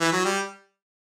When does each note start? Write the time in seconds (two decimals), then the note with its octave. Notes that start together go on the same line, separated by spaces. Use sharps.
0.01 E3
0.13 F#3
0.25 G3